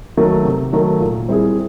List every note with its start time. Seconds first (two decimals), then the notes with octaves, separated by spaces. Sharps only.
0.17 D#3 F#3 A3
0.45 C3
0.73 D#3 F#3 A3
1.00 A#2
1.28 G3 C4 E4 G#4